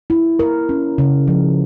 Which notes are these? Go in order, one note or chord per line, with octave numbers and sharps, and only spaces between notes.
E4
A#4
C#4
C#3
F3